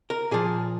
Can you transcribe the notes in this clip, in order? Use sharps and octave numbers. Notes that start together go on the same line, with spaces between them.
A#4
A#2 F3 G#4